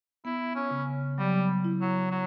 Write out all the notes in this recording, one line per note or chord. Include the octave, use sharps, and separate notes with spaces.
B3 E4
C#4
C#3
F#3 G3
E4
F#3
F#3